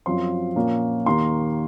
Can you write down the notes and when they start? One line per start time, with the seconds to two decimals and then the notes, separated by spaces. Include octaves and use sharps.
0.06 F#2 F3 C4 C6
0.56 A#2 F3 A#3 C#4
1.06 D#2 D#3 A#3 C6